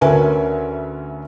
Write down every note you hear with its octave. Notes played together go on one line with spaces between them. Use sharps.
D2 C#4 A#4 B4 E5 G#5